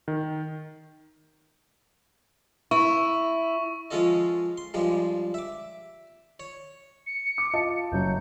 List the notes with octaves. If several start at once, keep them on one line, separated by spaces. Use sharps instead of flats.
D#3
E4 C#6
F3 G#3 C#4 F4 A4 D#5
C6
G2 F3 G3 G#3
E5 D6
C#5
C#7
D6
F4 D#5 A5
F#1 F#3 G6